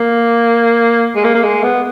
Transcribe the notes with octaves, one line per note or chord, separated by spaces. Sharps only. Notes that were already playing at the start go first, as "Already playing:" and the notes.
Already playing: A#3
G#3
A#3
A#3
G#3
B3